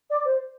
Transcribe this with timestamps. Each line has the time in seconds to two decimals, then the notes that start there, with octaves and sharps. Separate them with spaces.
0.10 D5
0.25 C5